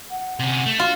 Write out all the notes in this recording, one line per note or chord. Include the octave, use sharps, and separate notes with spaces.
F#5
C3 C#4
A3
F4 F#4 F5